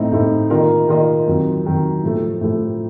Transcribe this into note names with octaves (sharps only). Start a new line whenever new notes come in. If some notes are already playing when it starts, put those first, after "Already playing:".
Already playing: A2 A3 C4 D#4
A2 A3 C4 D#4
D#3 A#3 F4 A#4 D#5
D#3 A#3 F4 A#4 D#5
F2 D#3 F#3
F2 D#3 F#3
A2 F3 A3
A2 F3 A3